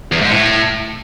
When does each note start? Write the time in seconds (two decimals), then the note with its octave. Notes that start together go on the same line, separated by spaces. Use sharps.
0.12 E2
0.21 G#2
0.30 A2